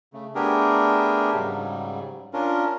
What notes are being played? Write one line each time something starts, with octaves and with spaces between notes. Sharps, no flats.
C#3 A3
A3 B3 D4 G4 G#4 A#4
G#2 C#3 F#3 G3
C#4 D4 F4 A#4